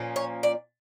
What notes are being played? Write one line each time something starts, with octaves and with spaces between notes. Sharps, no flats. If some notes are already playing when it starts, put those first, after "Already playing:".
Already playing: A#2 F3 A#3 C#4
C#5
D5